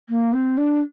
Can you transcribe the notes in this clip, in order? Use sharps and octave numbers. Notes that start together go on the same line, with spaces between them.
A#3
C4
D4